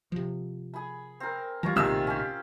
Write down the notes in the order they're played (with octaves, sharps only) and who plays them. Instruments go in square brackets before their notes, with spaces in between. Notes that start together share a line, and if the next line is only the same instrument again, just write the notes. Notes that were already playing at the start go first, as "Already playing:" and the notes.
[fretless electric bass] C3 F3
[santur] G#4 B5
C4 A#4
[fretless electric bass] E3 G3 [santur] F4 C#5 A#5
[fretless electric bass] A#1 A2 [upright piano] C3 D#3 E6 [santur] C4 G#4
[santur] C#4 G4